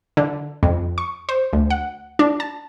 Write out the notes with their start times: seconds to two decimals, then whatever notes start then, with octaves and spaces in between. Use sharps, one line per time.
0.17 D3
0.63 F2
0.98 C#6
1.29 C5
1.53 D2
1.70 F#5
2.19 D4
2.40 A5